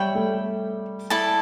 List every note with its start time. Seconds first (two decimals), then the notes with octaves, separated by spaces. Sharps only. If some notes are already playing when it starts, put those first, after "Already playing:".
Already playing: G3 C#5 E5 G5 B5
0.15 A3
1.10 E4 A4 D5 A5